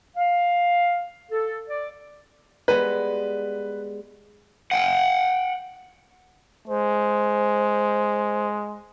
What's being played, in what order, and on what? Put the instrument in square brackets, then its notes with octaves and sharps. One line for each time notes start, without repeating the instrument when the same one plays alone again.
[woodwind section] F5
A4
D5
[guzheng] G3 G#3 B3 [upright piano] B4
[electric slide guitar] F#5 G5
[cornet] G#3 [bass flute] C5